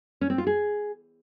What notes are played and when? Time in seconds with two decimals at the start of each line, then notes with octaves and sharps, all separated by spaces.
0.21 C#4
0.30 C4
0.38 F4
0.47 G#4